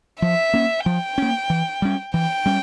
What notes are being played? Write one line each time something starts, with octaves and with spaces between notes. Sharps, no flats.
F3 E5
A#3 C#4
F3 G5
A#3 C#4
E3
G3 C#4
E3 G5
G3 C#4